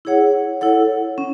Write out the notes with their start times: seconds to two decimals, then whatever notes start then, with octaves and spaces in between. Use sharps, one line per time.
0.05 E4 G#4 C#5 F#5
0.61 E4 A4 C#5 F#5
1.18 C#4